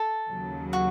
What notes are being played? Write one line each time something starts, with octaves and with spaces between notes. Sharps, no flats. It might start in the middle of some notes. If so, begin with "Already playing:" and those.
Already playing: A4
D#2 C#3 F#3
F#4